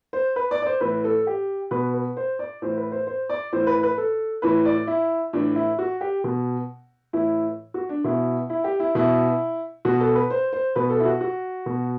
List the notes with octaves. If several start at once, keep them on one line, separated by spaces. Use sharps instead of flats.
C5
B4
D5
D5
C5
A2 E3 B4
A4
G4
B2 B4
B4
C5
D5
A2 E3 C5
B4
C5
C5
D5
A2 E3 C5
B4
B4
A4
A2 E3 B4
D5
E4
A2 E3 D4
E4
F#4
G4
B2
A2 E3 E4
F#4
D4
B2 E4
E4
G4
E4
B2 E4
B2 F#4
A4
B4
C5
C5
B2 B4
A4
E4
F#4
F#4
B2